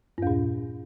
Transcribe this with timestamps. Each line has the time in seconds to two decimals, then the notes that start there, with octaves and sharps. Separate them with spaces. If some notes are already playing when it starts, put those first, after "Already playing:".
0.18 G2
0.22 E2
0.27 A#2